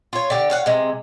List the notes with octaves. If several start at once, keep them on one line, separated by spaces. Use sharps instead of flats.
F4 C#5
D3 G4
C#5 F5 F#5
C3 G#3